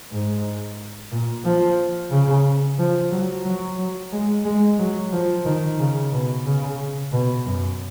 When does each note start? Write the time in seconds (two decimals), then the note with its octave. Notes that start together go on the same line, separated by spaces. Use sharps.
0.12 G#2
1.12 A#2
1.44 F3
2.11 C#3
2.79 F3
3.11 F#3
3.45 F#3
3.78 F#3
4.12 G#3
4.45 G#3
4.79 F#3
5.13 F3
5.46 D#3
5.79 C#3
6.12 B2
6.46 C#3
7.12 B2
7.46 F#2